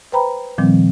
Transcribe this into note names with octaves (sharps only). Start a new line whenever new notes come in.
B4 C5 G5 A#5 B5
A#2 D#3 F3 G3 C4